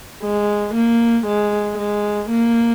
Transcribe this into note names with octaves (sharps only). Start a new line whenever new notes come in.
G#3
A#3
G#3
G#3
A#3